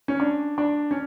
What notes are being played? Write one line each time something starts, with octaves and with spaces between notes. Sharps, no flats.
C#4
D4
D4
C#4